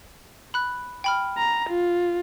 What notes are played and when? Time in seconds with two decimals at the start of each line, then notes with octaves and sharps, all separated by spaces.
0.54 B5 F#6
1.04 G5 B5 F6
1.38 A#5
1.70 F4